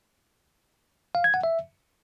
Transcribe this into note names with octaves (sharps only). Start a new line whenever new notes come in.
F5
G#6
F#5
E5